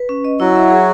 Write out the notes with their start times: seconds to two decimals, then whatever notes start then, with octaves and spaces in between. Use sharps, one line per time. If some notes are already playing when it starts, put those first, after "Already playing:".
Already playing: B4
0.09 C#4
0.24 D#5
0.40 F#3 E4 F#4
0.56 E5
0.70 G#4